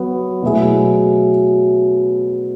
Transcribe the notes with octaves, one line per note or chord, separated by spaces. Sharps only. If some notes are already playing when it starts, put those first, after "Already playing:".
Already playing: F#3 B3 F#4
B2 F#3 A3 E4 G#4